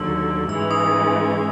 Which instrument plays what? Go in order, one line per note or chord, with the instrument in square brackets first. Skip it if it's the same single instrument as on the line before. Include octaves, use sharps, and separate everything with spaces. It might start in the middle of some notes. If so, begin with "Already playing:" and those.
Already playing: [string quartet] D#2 D3 F#3 [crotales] E6
[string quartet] G#2 E3 G#3 C#4 [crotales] E6
[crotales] D#6